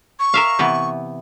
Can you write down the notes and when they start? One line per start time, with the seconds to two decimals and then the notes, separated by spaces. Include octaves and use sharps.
0.20 C#6
0.34 A#4 E5 F5
0.59 C3 E3 B3